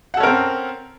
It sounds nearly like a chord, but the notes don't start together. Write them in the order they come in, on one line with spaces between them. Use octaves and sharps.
F#5 A4 C#4 A#4 C4